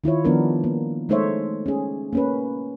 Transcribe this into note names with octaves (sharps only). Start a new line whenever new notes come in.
D#3 E4 F4 C#5
D#3 F3 G3 B3 D4 A#4
A#3
G#3 A3 D#4 C5 C#5 E5
C#4 G#4
A#3 C#4 B4